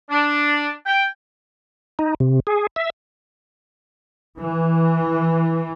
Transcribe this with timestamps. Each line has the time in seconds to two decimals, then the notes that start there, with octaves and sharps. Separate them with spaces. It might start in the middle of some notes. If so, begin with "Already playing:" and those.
0.11 D4
0.86 G5
1.99 D#4
2.20 C3
2.47 G#4
2.76 E5
4.37 E3